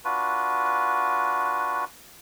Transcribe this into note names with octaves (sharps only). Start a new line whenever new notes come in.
D4 F4 F#4 B4